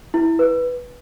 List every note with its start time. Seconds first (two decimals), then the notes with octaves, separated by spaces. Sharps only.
0.14 E4
0.39 B4